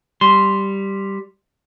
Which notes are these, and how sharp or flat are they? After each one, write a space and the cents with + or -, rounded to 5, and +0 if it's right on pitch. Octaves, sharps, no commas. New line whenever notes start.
G3 +0 C6 +0